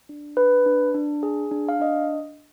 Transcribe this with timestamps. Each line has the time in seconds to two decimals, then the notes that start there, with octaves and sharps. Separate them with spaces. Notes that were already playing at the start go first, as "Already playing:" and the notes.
0.09 D4
0.37 D4 B4
0.66 D4
0.95 D4
1.23 G#4
1.51 D4
1.69 F5
1.80 D4 D#5